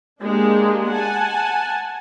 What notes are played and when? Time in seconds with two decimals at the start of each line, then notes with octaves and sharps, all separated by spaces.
0.22 G#3 A#3 D4 G4
0.89 F#5 G#5 A5